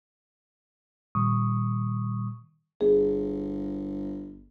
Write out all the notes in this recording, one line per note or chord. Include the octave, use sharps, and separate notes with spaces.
A#2 D#3 G3 C#6 D#6
G1 G#4